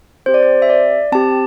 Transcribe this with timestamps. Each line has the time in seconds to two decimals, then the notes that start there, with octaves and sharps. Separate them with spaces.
0.26 C4 G4 C5
0.34 D5
0.43 C5
0.62 E5
0.70 D5
1.12 C4 G4 A5